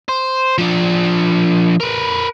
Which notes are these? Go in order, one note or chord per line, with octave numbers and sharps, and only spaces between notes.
C5
F3 D4
A#4 B4